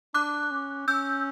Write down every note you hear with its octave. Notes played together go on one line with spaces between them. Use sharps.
D4 D6 F#6
C#4
C#4 E6 G6